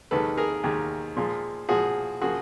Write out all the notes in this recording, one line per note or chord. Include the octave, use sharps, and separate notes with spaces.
D#2 D#3 G#3 A4 B4
G#4 A#4
D#2 D#3 G#3
A#2 F3 G#3
A#2 F3 G#3 F#4 G#4
C#3 F3 A#3 F#4 G#4